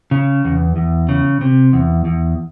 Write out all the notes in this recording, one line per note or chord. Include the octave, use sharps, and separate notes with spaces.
C#3
E2
E2
C#3
C3
E2
E2